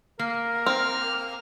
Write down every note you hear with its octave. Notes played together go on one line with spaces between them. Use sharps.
A#3 A#4
C4 F6